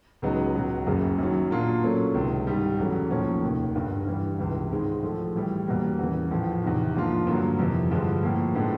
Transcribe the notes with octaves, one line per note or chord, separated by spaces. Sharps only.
C#2 C#3 F#3 B3 D#4
C#2 B2 F#3
F#1 F#2 C#3
F#2 D#3 F#3
A#2 F#3 A#3 D4 F4
A#2 F#3 A3 C#4
C#2 C3 D#3
G#2 D#3 G3
E2 C#3 F#3 A3
B1 A2 F3 A#3 C#4
F1 D#2 D#3
G1 G2 D3 G3
G2 E3 G3
C#2 C3 E3
G#2 D#3 G#3 C4
A2 F3 A3
A2 E3 G3
E1 E2 B2 G3 A#3
E2 C#3 E3
A1 A2 F3
E2 C3 D#3
G#2 F3 A#3 D4 F4
G2 D3 F#3 A#3
F2 C3 E3
G2 D3 F3 G#3
A2 F3 A#3
A2 F3 G#3 B3 D4